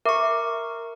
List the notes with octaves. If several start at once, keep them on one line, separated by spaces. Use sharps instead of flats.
A#4 E5 C#6 D6